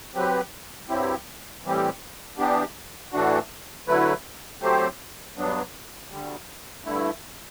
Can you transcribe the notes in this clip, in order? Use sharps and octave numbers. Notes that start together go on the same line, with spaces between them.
F#3 C4 G4 B4
G2 F#3 C4 E4 G4
A2 E3 G3 C4 G4
E3 B3 D4 G4
A2 E3 A3 D4 F#4
D3 F#3 A3 E4 B4
F#3 A3 C4 G4 C5
G2 F#3 B3 D4
D2 D3 G3
G2 D3 A3 E4